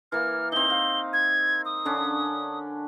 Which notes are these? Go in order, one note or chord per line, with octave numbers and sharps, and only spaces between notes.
E3 A#3 F6
C4 D#4 G7
F5
G#6
D#6
D3 C#4 D4